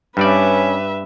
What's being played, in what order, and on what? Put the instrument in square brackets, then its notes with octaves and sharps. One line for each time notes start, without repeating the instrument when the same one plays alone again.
[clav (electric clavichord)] G2 G3 D5 [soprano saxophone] C#4 [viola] B4 E5